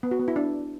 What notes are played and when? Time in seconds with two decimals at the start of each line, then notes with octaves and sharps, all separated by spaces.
0.03 B3
0.11 F#4
0.20 B3
0.28 E4
0.36 D4